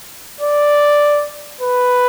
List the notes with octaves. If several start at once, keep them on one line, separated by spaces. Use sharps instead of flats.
D5
B4